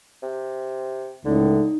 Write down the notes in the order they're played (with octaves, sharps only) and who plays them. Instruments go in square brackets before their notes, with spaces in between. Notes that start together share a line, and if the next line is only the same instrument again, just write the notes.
[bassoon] C3
[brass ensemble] C#2 A2 [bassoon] D3 [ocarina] D#4